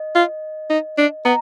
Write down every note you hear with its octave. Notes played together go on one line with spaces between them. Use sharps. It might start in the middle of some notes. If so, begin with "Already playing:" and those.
Already playing: D#5
F4
D#4
D4
B3 A#5